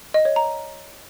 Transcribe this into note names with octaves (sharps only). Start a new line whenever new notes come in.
D#5
C#5
A#5